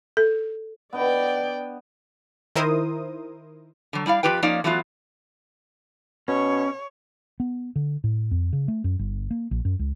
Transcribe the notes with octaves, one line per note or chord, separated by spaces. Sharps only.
A4
B3 D4 D5 D#5 G5
D#3 E4 A#4 C5 D#6
D3 F#3
G3 E4 D5 F5
F2 A#3 F4 G4 B4 G5
F3 A#3 C#4 D#4 D5
D3 E3 F#3 A3 B3 F4
B2 C#4 C#5
B3
D3
A2
F2
C#3
A3
F#2
G1
A#3
A#1
F#2
C#2